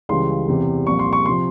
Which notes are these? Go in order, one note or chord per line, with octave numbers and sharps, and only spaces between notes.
C#2 C#3 E3 G3 C6
E2 C3 E3
C2 A#2 F3 C#6
C6
C#6
C3 F3 C6